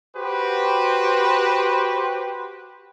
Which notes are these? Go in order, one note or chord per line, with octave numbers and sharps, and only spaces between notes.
F#4 G4 B4 C5